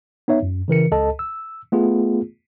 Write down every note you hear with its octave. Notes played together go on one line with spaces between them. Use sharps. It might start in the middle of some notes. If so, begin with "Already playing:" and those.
B3 D#4 C#5 E5
F#2
C#3 E3 A#4 C#7
C#2 A4 D#5 A5
E6
A3 B3 F4 G#4